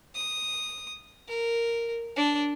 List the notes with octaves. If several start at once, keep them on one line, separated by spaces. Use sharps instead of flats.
D#6
A#4
D4